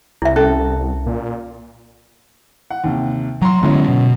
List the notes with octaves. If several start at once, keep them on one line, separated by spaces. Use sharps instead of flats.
C2 E4 E5
C#4 A4
A#2
F#5
D#2 C3
F#3 A#5 C6
F#2 D3 F#3 G#3 B3 E4
B2